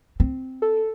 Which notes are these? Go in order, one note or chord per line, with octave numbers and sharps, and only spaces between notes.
C4
A4